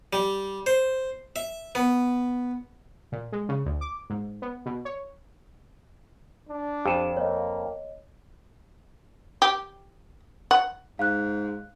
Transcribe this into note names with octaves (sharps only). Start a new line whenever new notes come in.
G3
C5
E5
B3
A#2
G#3
C#3
D2
D6
G#2
B3
B2
C#5
D4
F2 G4 E7
A#3 C#5 D#5
G4
F#5
G#2 F5 F#6